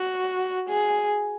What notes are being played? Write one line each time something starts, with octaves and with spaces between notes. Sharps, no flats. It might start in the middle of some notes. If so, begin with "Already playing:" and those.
Already playing: F#4
G#4